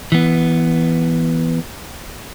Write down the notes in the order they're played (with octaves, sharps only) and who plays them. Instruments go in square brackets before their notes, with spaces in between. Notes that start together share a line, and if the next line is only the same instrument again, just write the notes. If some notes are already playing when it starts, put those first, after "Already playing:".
[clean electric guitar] E3 B3